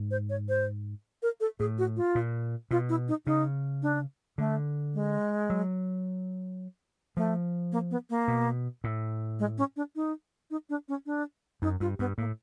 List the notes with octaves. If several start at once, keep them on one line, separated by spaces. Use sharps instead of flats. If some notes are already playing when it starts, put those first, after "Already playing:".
Already playing: G#2
C5
C#5
C5
A#4
A4
A2 G#4
F#4
F4
A#2
B2 F4
E4
D#4
C#3 D#4
D4
D3 A3
G#3
F#3
F3 A3
A#3
B3
A#3
B2
A2
G#3
C#4
D4
D#4
D#4
D4
C#4
D4
F#2 D#4
G2 F4
G2 B3
A2 A#3